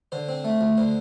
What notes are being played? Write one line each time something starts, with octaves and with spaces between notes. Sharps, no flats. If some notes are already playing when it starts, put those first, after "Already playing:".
D3 C5
C4
A3
D2
D3 C5